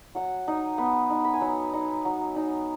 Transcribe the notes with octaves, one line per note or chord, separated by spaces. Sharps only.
F#3 F#5
D#4
B3
D#4
B5
G#5
F#3 F#5
D#4
F#3
D#4